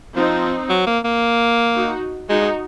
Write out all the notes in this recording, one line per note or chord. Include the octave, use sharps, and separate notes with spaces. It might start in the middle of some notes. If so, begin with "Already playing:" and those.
F3 C4 D#4
F#3
A#3
A#3
D#4 F#4
G#3 D#4 F#4